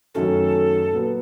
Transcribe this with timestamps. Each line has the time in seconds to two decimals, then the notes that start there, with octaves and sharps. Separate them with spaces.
0.15 F#2 D#3 F#3 A3 C#4 A4
0.92 A#2 F#3 B3